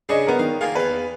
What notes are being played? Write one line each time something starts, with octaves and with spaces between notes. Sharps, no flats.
G2 C#3 G#4 D5 D#5 C#6
B3 A#4
D#3 F5
A#3 F4 G#4 F5
E2 B4 F5